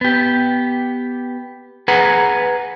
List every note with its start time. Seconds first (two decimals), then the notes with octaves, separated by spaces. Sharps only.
0.01 B3 G4
1.88 G#4 B4 F#5 A#5